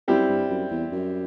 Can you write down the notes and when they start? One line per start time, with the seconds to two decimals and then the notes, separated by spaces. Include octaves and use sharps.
0.08 F#2 G3 C4 E4 G4
0.29 G2
0.50 F#2
0.71 E2
0.92 F#2